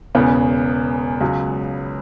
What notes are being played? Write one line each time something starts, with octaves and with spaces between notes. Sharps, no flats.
E1 E2 C#3 B3
C#2 C#3 F#3